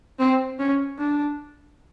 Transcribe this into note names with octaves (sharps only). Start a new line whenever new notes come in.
C4
C#4
D4